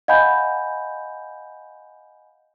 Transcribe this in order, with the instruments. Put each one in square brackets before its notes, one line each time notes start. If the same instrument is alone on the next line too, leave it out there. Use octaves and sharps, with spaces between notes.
[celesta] D#5 F5 F#5 G#5 B5 G6